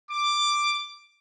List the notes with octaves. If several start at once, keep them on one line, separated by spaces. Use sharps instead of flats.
D6